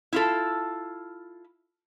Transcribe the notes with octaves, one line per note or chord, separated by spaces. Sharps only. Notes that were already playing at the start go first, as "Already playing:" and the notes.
E4 F4 A4